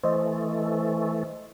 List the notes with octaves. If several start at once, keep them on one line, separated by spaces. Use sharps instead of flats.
E3 A3 C5 D#5